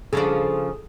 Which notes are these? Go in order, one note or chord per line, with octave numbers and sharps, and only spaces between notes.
C#3 F3 D4 G#4 A4